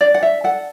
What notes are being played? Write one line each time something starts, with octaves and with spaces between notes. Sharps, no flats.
D4 D5
F#5
E5
A4 F#5